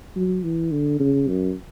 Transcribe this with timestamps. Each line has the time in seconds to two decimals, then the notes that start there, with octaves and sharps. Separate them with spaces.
0.16 F#3
0.43 E3
0.71 D3
1.00 C#3
1.28 F#2